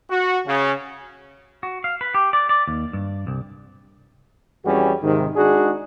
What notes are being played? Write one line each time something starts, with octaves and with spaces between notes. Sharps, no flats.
F#4
C#3
F#4
F5
B4
G4
D5
D5
D#2
G2
C2
F2 E3 G3 C#4 F#4 G#4
G#2 C3 D#3
G#3 D4 D#4 F#4 G#4